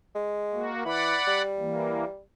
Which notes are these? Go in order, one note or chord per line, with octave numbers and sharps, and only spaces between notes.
G#3
A#3 F#4
E3 D5 F#5 B5
G3
E3 A#3